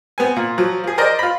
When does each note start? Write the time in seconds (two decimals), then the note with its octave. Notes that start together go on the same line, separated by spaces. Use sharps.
0.18 B3 C4 G#5
0.36 A#2
0.58 F3 F#3
0.84 F3 G#4
0.98 A#4 C5 D5 D#5
1.19 F4 B5